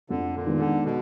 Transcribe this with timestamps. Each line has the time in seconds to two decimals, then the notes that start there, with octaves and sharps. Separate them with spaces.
0.10 F2 D3
0.35 A#2
0.46 D#3 G#3 B3
0.58 D3
0.84 B2